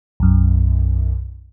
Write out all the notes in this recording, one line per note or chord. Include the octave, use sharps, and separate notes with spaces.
B1 F#2